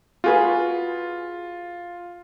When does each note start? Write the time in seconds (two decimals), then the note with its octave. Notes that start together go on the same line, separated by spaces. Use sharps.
0.24 F4 F#4 G#4 B4